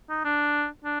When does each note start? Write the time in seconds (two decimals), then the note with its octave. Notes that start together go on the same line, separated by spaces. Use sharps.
0.10 D#4
0.25 D4
0.85 D4